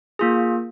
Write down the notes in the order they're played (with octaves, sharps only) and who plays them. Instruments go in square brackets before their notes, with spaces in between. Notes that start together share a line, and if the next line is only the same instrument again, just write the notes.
[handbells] A#3 F4 G#4